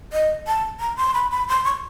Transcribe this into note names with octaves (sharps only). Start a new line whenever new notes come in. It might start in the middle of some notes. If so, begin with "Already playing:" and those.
D#5
A5
A#5
C6
B5
B5
C6
C#6